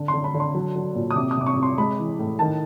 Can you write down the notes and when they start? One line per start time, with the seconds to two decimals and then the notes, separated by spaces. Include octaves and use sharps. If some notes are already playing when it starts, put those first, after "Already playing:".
Already playing: D3
0.08 C6
0.14 D3
0.24 B5
0.34 D3
0.40 C6
0.55 F#3
0.76 F#3
0.95 A#2
1.11 D#6
1.16 C3 D6
1.31 D#6
1.37 C3 D6
1.46 C#6
1.57 C3
1.63 C6
1.78 G#3 B5
1.99 E3
2.19 A2
2.39 D#3 A5